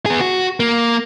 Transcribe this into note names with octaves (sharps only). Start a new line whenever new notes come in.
B3 G#4
F#4
A#3